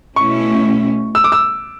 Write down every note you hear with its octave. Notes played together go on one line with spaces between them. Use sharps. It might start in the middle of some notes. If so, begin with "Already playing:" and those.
B2 A3 C#4 E4 C#6
E6
D6
E6